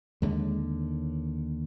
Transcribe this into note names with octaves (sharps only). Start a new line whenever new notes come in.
D#2 D3 G#3